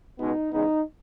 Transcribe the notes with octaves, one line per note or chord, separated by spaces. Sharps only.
C#2 B2 G#3 B3 D#4
E2 C#3 G#3 B3 D#4